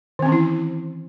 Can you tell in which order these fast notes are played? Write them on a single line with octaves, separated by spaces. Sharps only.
D#3 C4 C#4 E3 E4